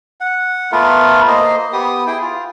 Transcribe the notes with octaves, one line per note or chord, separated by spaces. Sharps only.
F#5
A3 B3 F4 A#4
A#3 C5 D#5
B3 G4 D#6
E4 G#4 G5
F4